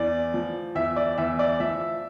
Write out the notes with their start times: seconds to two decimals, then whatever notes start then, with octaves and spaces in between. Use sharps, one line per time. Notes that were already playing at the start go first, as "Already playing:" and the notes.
Already playing: E2 D5
0.34 F3
0.75 E2 E5
0.96 D5
1.18 E2 E5
1.39 D5
1.60 F3 E5